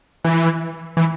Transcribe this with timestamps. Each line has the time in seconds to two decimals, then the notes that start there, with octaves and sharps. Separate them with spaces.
0.25 E3
0.97 E3